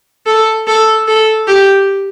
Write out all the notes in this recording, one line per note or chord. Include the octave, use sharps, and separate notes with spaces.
A4
A4
A4
G4